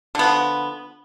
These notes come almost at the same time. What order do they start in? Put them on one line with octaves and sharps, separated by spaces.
D3 B3 F3